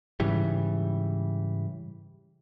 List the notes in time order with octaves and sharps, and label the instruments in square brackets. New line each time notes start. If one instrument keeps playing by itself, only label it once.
[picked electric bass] G#2 C#3 E3 G3